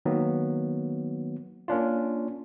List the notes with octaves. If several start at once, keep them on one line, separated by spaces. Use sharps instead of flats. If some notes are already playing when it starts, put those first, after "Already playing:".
D#3 F#3 A#3 B3
A#3 C#4 D4 F4